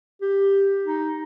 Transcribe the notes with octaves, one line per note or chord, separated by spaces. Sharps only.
G4
D#4